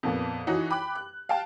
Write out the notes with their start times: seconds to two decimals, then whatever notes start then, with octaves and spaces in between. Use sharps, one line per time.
0.03 F2 A#2 B3
0.47 E3 D#4 F#4 C#5
0.70 G5 B5 D6 F#6
0.95 F#6
1.29 F5 G5 A5